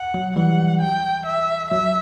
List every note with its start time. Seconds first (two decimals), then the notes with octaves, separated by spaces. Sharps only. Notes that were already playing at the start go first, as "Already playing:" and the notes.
Already playing: F#5
0.14 F#3
0.36 E3 G3 F#5
0.82 G5
1.26 E5
1.71 F#3 E5